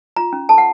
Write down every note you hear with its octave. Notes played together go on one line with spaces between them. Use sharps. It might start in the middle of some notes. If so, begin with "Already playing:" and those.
F4 A#5
C#4
A4 A5
F#5